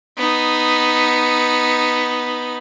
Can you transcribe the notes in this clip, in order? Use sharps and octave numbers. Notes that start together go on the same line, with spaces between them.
B3 D#4